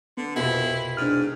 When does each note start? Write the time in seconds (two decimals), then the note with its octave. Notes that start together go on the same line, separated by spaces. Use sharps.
0.17 D3 B3
0.36 C2 F2 B2 E4
0.97 G#2 D4 F6